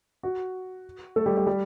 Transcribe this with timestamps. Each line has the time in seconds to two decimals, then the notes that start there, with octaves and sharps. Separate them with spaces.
0.23 F#4
1.16 A3 A4
1.26 G3 G4
1.37 G3 G4
1.47 G3 G4